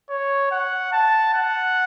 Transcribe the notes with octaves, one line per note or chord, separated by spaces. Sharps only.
C#5
F#5
A5
F#5